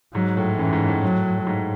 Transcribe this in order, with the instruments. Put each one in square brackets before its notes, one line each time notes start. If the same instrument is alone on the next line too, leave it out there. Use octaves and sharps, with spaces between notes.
[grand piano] G#2 [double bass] F#3
[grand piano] A2
[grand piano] F#2 [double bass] E3
[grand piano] G#2
A2
[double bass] F#3
[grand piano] G#2